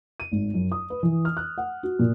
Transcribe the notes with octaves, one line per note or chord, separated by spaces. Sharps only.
D#7
G#1
F#2
D#6
B4
E3
F6
F#6
F#5
F#4
A#2